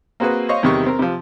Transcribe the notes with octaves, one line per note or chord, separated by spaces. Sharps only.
A#3 C4 F#4 G#4 B4
C5 C#5 D#5 F5 C#6
E2 C3 D#3 G3 C#6
C4 A#4
C3 F3